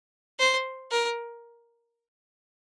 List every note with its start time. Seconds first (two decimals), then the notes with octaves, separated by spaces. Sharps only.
0.39 C5
0.91 A#4